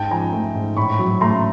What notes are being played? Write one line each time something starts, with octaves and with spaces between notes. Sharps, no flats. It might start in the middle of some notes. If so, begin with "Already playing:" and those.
Already playing: G#2 G5 A5
F3 G#5 A#5
A3
G#2
A2 B5 C#6
F#3
A3 A#5 C6